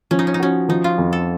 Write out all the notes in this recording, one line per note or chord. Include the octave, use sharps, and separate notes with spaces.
F3 C#4
D#4
C#4
D#4
C#4 F#4
F3 D#4
F4
F2
A4